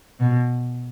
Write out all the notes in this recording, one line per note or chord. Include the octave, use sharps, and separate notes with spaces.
B2